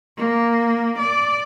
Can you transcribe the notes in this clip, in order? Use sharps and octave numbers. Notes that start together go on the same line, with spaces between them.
A#3
D5